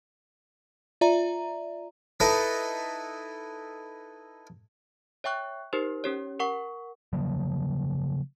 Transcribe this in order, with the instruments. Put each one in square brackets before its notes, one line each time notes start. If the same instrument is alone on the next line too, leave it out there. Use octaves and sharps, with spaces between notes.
[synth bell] F4 D5 E5 A#5
[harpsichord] D#4 E4 A4 B4 D#5 E5
[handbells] C#5 E5 G5 C#6 F#6
D#4 G4 A#4 C5
C#4 G4 C#5
A#4 F#5 C#6
[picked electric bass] C#3 F3 F#3 A#3